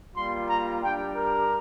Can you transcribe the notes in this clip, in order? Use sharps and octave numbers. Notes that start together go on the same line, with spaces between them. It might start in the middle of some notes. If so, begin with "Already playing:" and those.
G3 A#3 F4 C6
A#5
G3 D4 G4 G5
A#4